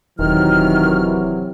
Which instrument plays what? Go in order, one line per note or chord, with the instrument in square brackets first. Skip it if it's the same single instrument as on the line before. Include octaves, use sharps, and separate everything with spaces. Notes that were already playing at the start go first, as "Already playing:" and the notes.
[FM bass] D#1 [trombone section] C3 E3 F#3 [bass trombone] D#3 [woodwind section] F6